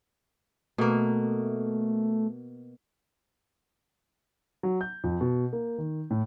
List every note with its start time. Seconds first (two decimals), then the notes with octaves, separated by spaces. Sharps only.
0.78 B2 A3 A#3
4.63 F#3
4.81 G6
5.04 F2
5.21 B2
5.53 A#3
5.78 D#3
6.11 A2